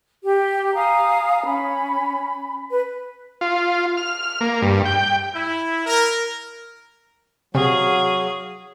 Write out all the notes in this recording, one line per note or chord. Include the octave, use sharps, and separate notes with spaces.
G4
F5 G#5 A#5 D#6
C#4 B5
B4
F4
F6
A#3
G2
G5
E4
A#4
C3 F#3 F#4 G#4 F5